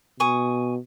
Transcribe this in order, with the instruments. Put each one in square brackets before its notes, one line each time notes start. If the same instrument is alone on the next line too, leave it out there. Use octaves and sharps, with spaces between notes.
[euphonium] B2 [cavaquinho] G#5 C#6 D#6